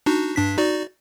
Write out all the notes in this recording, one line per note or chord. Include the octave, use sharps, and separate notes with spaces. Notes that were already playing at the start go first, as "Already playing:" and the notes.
D4 D#4 F#4
G2 D4 B6
D#4 F#4 D5